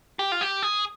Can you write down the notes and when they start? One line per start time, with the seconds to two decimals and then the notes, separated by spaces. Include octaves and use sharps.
0.19 G4
0.32 F4
0.41 G4
0.62 G#4